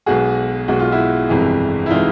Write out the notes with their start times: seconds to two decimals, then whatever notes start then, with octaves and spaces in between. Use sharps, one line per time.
0.06 B1 B2 G#3 F#4 G#4
0.68 B1 B2 G#3 F#4
0.80 F4
0.92 E4 F#4
1.29 G1 F2 C3 E3 G#3
1.86 E4
1.90 C3 E3 G#3 D#4 F4